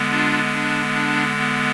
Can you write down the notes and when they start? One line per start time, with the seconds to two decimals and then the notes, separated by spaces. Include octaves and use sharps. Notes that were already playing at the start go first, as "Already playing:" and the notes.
Already playing: D3 G#3 B3
0.10 D4 F4
0.52 D4
0.94 D4
1.36 B3